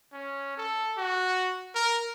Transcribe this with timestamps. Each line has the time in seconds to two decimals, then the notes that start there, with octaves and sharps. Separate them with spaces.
0.13 C#4
0.57 A4
0.97 F#4
1.75 A#4